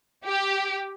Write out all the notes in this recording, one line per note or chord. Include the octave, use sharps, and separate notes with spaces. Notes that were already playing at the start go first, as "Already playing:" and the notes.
G4